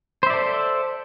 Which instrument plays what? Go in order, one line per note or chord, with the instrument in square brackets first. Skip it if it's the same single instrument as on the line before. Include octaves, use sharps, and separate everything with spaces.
[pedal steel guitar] C5
E5
D5
A4